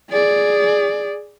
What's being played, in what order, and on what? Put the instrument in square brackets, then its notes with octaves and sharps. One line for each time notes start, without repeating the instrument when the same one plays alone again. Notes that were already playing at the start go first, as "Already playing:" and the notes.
[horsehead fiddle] G#4 D5